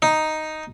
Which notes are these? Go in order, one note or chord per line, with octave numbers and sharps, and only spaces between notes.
D#4